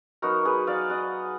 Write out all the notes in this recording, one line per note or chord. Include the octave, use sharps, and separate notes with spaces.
F#3 B3 D#4 F#4 A#4
G#4 B4
D5 F5
D#5 F#5